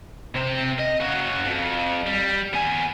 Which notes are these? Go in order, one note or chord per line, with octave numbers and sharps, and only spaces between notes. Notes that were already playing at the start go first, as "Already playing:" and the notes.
C3 C4
D#5
C#3 F#4
F2
G3
B3 G#5